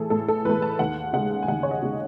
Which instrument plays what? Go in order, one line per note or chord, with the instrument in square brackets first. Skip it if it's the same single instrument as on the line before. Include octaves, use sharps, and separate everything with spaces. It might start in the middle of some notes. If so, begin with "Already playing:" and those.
Already playing: [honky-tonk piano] A2 E3 A3 G#4 A4
A2 A4
A4
E3 B4
A3
A5
D#2 F#5
C#3 G#3 F#5
G#5
D#2 F#5
C#5
D#5
C#3 G#3